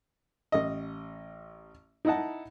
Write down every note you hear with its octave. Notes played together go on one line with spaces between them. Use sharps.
A1 D#5
D#4 E4 D#5 F#5 A5